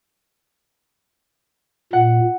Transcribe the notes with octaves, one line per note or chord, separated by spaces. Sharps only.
A#2 F#5